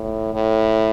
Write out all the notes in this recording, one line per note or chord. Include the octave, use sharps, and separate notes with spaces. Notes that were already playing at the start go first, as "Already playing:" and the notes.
Already playing: A2
A2